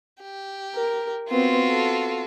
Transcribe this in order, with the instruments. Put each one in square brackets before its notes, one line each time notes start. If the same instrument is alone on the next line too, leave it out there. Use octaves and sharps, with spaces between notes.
[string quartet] G4
[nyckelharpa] A#4
[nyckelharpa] B3 C4 [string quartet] F4 F#4
[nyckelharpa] A4